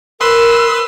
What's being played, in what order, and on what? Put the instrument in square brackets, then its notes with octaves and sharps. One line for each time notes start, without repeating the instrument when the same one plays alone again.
[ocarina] A#4 [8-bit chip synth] B4 C6 [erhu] E6